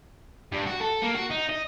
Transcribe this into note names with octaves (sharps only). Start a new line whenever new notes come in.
G2
F#4
A4
A#3
F#4
D#4
D#5